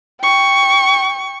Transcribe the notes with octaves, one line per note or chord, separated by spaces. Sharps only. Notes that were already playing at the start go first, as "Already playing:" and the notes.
G5 C#6